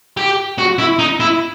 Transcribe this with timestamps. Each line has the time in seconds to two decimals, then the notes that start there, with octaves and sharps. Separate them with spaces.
0.17 G4
0.58 F#4
0.79 E4
0.99 D#4
1.20 E4